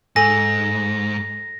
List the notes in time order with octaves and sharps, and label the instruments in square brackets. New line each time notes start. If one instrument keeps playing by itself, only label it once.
[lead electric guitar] G#2 [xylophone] A4 G#5 [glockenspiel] A#6